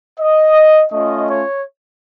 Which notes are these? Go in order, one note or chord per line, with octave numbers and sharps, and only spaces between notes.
D#5
A3 C#4 F4 D#5
C#5